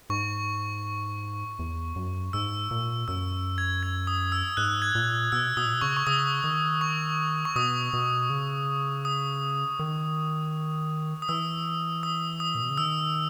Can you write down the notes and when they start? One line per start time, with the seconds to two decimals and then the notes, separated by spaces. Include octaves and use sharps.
0.10 G#2 C#6
1.59 E2
1.96 F#2
2.33 G#2 E6
2.71 A#2
3.08 F#2 E6
3.58 G#6
3.83 G#6
4.07 D#6
4.32 E6
4.57 G#2 F#6
4.82 G#6
4.95 A#2
5.32 B2 E6
5.57 B2 D#6
5.65 A#2
5.73 B2
5.81 C#3 C#6
5.97 C#6
6.07 C#3 D#6
6.44 D#3
6.81 C#6
7.45 C#6
7.56 B2 D#6
7.93 B2
8.30 C#3
9.05 D#6
9.79 D#3
11.22 D#6
11.29 E3 E6
12.03 D#6
12.40 D#6
12.55 A#2
12.62 B2
12.70 C#3
12.78 D#3 E6